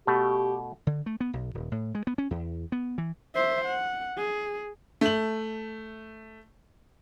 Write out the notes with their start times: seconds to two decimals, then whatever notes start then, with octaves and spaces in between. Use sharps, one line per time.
0.07 B2 A3 G4
0.87 D3
1.06 A3
1.20 B3
1.33 B1
1.55 D#1
1.72 A2
1.95 G#3
2.07 B3
2.18 C#4
2.31 E2
2.72 B3
2.98 E3
3.35 C5 E5
3.65 F#5
4.17 G#4
5.01 A3 F#7